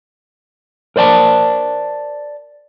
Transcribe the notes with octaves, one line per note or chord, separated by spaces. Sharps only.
A#4 C5 D5 G#5 A5